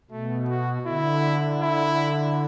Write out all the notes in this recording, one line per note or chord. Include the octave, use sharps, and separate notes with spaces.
B2 A3
F#4
D3 E4
E4